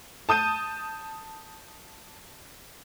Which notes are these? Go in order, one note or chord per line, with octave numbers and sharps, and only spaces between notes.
A5 D#6 G6 D#7